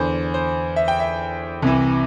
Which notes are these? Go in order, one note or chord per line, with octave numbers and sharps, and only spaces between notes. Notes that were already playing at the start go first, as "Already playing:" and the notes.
Already playing: E2 D3 C5
C5
E5
G5
E5
C2 C3 E3